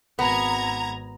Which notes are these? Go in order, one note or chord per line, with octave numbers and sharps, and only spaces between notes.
G#1 B3 A#5 G#6